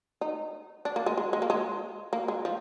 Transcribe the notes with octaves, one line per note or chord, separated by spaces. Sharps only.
D#4
D4
A#3
G#3
G#3
G#3
A#3
G#3
A#3
G#3
F3